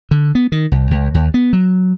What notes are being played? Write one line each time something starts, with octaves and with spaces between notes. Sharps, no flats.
D3
B3
D#3
C2
C#2
D#2
B3
F#3